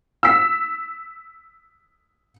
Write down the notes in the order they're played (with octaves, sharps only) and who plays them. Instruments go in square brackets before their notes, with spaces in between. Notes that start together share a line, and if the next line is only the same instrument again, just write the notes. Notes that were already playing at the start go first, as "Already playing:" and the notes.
[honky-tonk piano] E6 B6